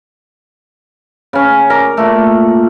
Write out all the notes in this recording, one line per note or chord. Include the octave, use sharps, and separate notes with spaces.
C#3 C#4
A#4 D5
A#2 A3